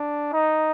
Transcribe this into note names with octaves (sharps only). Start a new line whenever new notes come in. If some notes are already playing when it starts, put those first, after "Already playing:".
Already playing: D4
D#4